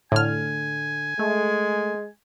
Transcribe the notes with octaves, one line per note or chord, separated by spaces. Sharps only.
A2 D3 G#5 F6
G#3 A3